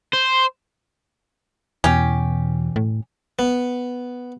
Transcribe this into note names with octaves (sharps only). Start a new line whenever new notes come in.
C5
E2 B2 E3 C#4 G4
A2
B3